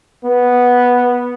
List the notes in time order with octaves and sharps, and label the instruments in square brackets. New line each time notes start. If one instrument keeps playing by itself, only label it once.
[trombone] B3